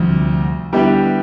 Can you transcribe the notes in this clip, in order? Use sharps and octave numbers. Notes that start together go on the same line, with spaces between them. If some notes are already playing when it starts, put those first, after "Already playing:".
Already playing: D2 C3 F3 G3
D3 G3 B3 E4 G4